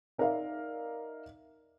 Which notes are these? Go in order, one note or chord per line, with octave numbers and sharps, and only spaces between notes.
D#4 A#4 D5 E5 F5